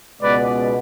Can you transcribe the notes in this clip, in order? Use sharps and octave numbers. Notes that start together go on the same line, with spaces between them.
C#2 B2 G#3 B3 B4 D5